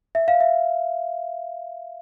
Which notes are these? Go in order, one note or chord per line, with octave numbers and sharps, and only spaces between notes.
E5
F5
E5